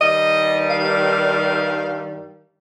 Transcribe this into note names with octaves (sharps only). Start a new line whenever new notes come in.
G2 D#3 G3 D#5
F5